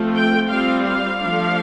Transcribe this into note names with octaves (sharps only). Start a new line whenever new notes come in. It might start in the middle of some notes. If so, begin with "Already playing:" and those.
Already playing: F3 A3 C4 F4
G5
G3 C4 F4 F5
F5
F3 A3 D4